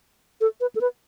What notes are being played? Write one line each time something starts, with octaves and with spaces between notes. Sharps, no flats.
A4
B4
A4
B4